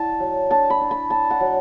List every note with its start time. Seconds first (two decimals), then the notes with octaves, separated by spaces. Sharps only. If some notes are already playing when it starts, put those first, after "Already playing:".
Already playing: E4 D5 F#5 A5
0.20 F#3
0.51 D4 A5
0.70 B5
0.81 D4
0.91 B5
1.10 D4 A5
1.31 F#5
1.41 F#3